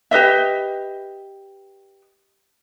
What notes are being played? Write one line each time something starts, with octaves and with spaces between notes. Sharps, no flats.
G4 B4 D#5 E5